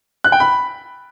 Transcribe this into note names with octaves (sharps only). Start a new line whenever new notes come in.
F#6
G5
B5